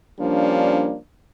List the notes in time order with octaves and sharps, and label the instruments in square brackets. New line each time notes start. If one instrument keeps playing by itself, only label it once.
[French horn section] F3 G3 A#3 C#4 D4